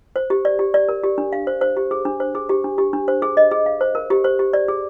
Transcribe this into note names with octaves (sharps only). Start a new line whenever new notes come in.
C5
G4
D5
G4
D5
A#4
G4
D4
F5
C5
C5
G4
G#4
D4
C5
G#4
G4
D4
G4
D4
C5
G#4
D#5
G#4
F5
C5
A#4
G4
C5
G4
D5
G#4